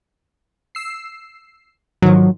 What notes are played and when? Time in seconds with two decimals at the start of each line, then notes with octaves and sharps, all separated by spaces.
0.75 E6 C7
2.02 G#2 D#3 F3 F#3